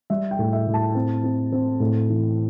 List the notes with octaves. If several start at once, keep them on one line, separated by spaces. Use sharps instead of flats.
G3 E5
G5
A2
E5
A2
A5
C4
C4
C4
A2
E3